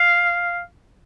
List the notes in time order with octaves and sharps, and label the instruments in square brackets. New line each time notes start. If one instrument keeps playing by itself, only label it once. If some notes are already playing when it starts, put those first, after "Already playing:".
Already playing: [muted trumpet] F5